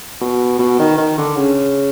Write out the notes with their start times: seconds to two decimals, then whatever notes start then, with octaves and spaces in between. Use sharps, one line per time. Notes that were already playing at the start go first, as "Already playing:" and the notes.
0.21 B2
0.59 B2
0.79 D#3
0.98 D#3
1.18 D3
1.36 C#3